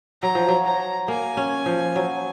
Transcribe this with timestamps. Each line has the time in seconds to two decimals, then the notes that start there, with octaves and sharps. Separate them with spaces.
0.22 F#3 A#5
0.35 F3
0.48 F#3
0.65 A#5
1.08 A#3 G#5
1.37 C#4
1.66 F3
1.96 F#3